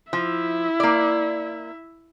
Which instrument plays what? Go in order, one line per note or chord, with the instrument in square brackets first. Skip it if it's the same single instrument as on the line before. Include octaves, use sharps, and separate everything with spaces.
[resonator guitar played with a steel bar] F3 [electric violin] E4 E5
[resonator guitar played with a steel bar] A#3 D5